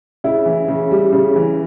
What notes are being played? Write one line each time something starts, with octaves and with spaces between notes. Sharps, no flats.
C#3 E4
E3
C#3
G3
C#3
E3